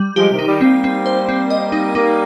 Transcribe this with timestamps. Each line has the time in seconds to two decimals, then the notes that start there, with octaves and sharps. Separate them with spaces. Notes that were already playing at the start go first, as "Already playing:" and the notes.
Already playing: G3
0.16 F3 G#3 G4
0.31 C3 D#3
0.39 D#4
0.46 D#3 G3
0.61 G3 A#3 C4
0.84 C4
1.06 C5
1.29 C4
1.50 D#5
1.72 D#4
1.95 G3 A#3 D#4